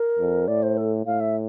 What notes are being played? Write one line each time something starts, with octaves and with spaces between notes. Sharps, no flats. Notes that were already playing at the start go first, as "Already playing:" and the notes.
Already playing: A#4
F2
A2 D5
C5
A4
A2 F5
E5